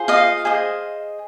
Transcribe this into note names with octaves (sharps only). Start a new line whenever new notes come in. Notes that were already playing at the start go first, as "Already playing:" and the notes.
Already playing: F4 G#4 C5
D#5 F5
G#4 C5 D#5